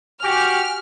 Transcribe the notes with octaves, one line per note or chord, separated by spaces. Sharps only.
F#4 G4 G#5 F6